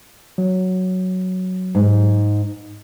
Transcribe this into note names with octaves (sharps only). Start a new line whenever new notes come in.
F#3
G#2